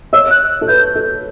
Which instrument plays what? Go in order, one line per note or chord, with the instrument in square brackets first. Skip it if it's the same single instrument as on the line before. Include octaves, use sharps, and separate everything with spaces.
[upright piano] C#5 [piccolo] E6
[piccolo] F#6
[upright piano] A4
[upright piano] B4 [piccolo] G6
[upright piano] A4